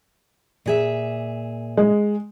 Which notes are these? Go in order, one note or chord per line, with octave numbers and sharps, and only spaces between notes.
A#2 G#4 E5
G#3